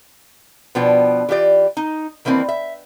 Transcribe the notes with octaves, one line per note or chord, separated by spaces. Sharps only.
B2 F3 B3 D4 G5
E3 F4 G4 D5
D#4
D#3 E3 A#3 C4 D4
E5